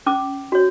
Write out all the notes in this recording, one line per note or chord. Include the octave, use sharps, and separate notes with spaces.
C#4 D6
F#4 C#5